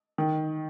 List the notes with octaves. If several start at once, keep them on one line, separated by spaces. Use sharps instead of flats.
D#3